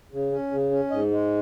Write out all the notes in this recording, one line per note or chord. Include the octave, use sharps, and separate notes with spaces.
C#3
C#4
C#3
C#4
G#2 D#5
G#3